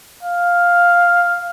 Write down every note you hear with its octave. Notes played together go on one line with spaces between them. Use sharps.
F5